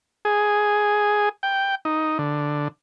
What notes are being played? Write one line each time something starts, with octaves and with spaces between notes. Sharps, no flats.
G#4
G5
D#4
D3